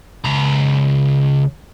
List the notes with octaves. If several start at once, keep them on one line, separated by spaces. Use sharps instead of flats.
C#2 A#5